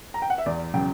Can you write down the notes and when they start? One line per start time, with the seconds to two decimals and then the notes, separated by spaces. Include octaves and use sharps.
0.14 A#5
0.22 G5
0.30 F#5
0.38 E5
0.46 E2 D5
0.74 C#3 F#3 G5